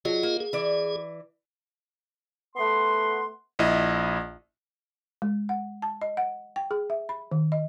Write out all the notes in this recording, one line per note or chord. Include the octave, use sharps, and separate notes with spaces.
F#3 F4 G#4 D#5
A#3
G#4
E3 D5
A3 B3 F#5 C6
A#1 E4 D#5
G#3
F#5
A5
D#5
F#5
G5
G#4
E5
B5
D#3
D#5